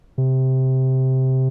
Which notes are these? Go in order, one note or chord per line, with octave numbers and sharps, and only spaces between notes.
C3